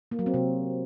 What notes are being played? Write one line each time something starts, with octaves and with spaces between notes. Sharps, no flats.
A#3
F#3
C4
C3